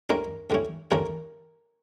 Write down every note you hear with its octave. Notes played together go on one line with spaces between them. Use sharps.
D2 D3 G3 C#4 E4 A#4
D2 D3 G3 C#4 E4
D2 D3 G3 C#4 E4 A#4